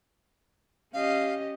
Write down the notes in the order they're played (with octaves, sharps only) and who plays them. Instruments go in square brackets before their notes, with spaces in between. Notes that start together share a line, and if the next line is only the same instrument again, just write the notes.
[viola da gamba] C#4 G4 D#5 [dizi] F5